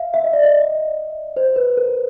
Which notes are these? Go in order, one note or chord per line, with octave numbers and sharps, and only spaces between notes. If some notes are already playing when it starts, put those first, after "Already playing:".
Already playing: E5 F5
E5
D#5
D5
D#5
C5
B4
A#4